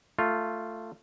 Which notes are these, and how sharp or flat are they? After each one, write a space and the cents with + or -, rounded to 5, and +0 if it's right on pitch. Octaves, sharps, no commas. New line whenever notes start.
A3 +15 F4 +0